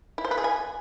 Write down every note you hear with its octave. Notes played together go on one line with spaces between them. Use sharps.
E4
C5
B4
G#4
G#5